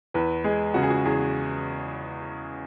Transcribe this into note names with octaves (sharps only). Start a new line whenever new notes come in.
E2 B4
G#3 G#4
C#3 F#4
G#4
F#4
E2 G#4